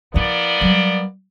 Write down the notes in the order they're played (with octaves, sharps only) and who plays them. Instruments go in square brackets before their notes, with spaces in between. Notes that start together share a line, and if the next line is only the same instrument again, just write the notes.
[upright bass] F3 E4 [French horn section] A#3 B3 D5
[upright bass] F#3 G3